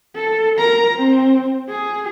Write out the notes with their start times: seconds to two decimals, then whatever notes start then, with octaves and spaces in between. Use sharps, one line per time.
0.15 A4
0.58 A#4 A#5
0.95 C4
1.69 G#4